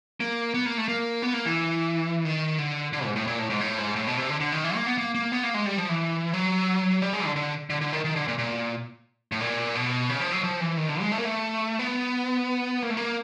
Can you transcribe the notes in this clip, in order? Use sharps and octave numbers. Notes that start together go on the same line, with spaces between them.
A#3
B3
A#3
A3
A#3
B3
A#3
E3
D#3
D3
D3
G#2
A2
A#2
A2
G#2
A2
G#2
A2
B2
C3
D3
D3
D#3
E3
A#3
B3
A#3
A#3
B3
A#3
G#3
G3
F3
E3
F#3
G3
G#3
D3
D3
D3
D3
D#3
D#3
D3
A#2
A#2
A2
A#2
B2
C#3
F3
F#3
F3
E3
D#3
D3
G#3
A3
A#3
A3
B3
A#3
A3
A#3